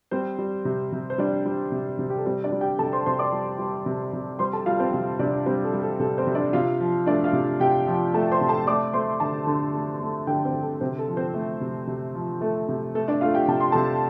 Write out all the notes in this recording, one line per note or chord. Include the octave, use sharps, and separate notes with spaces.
G3 C4 C5
G3
C3
C3
C5
G3 D4 D5
G3
C3
C3
G4
A4
G3 C4 C5
D4 D5
G3
G4 G5
C3 A4 A5
C5 C6
C3 C5 C6
D5 D6
G3
G3
C3
C3
G3 C5 C6
A4 A5
G3 F4 F5
C4 C5
C3 F4 F5
C3 D4 D5
G3 C4 C5
A4
G3
A4
C3 A4
C4 C5
C3
D4 D5
C3 F4 F5
F3
A3 D4 D5
F4 F5
C3
C3 G4 G5
F3
A3 A4 A5
C5 C6
C3
A4 A5
A3 D5 D6
A3 C5 C6
D3 A4 A5
D3
A3
A3
D3 G4 G5
C4 C5
D3
A4
C3 C4 C5
A4
F3
C4 C5
A3
C3
C3
F3
A3 A4
C3
A3 A4
D4 D5
A3 F4 F5
G4 G5
C3 A5
C6
C3 A4 A5